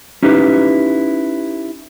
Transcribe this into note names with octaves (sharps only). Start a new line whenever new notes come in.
C#4 D#4 E4 G4 B4